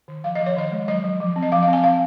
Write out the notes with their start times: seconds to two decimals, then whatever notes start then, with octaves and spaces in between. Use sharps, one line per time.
0.08 D#3
0.24 F3 F5
0.35 F3 D#5
0.46 C#5
0.56 D#3 D#5
0.72 G#3
0.88 F#3 D#5
1.04 F#3
1.20 F3
1.36 C4
1.43 D#5
1.52 F3 F5
1.63 F5
1.68 C4
1.73 G#5
1.84 C4 F5